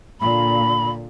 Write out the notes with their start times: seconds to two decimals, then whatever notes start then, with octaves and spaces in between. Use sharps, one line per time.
0.20 A#2 D3 B5